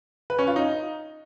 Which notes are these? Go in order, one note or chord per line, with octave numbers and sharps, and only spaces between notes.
B4
C#4
F4
D#4